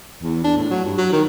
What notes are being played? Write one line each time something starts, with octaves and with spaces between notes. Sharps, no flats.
E2
D4
A2
F#3
G2
F#3
D#3